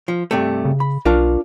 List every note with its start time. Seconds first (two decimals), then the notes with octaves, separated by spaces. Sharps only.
0.08 F3
0.31 G2 C3 A3
0.65 C#3
0.80 B5
1.05 B1 D4 F4 A#4